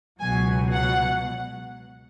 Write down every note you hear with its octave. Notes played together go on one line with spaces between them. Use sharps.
C#2 B2 F#3 G#5
F#5